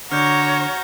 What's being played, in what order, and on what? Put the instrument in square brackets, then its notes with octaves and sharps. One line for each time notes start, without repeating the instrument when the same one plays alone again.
[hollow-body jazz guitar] D3 [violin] F#4 A#5 [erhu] C#5 [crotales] F6 G6